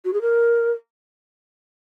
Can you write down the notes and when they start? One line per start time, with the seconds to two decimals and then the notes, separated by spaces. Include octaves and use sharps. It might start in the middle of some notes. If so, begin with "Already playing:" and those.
0.04 F#4
0.13 G#4
0.21 A#4